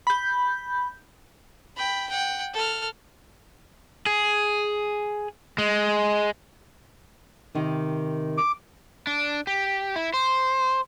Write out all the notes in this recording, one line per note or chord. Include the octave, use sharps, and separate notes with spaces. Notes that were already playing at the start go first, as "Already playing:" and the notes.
B5 G6
G5 B5
F#5 G5
A4 F6
G#4
G#3
C3 D#3 D#4
D6
D4
G4
E4
C5